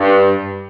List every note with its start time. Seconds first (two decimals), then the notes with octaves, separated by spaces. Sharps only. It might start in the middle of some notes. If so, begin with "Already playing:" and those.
Already playing: G2